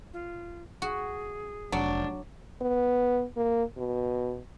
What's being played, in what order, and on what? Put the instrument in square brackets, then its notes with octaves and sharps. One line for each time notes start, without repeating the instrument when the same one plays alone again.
[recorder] F4
[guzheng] F#4 [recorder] G#4
[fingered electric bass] F1 [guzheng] F#3 [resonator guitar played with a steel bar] D4
[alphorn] B3
A#3
B2